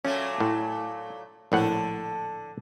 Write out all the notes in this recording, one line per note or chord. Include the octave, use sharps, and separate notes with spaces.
A#2 F#3 A3 C#4
A2
A#1 A2 D3 A4 F#5